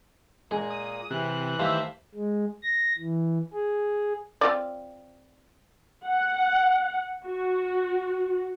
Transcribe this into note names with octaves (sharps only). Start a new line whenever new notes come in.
A#2 G#3 A#3 G#4 G#5
D#6
C3 E3 F#6
D#3 G3 A3 A#3 C5 E5
G#3
A#6
E3
G#4
C4 F4 D5
F#5
F#4